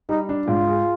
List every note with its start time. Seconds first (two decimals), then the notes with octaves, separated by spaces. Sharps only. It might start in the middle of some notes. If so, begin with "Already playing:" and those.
0.09 G3 D#4
0.29 D4
0.48 G#2 F4
0.68 G#4